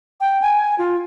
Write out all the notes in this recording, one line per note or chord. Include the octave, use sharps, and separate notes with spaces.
G5
G#5
F4